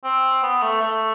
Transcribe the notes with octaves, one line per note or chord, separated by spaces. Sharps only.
C4
B3
A3
A3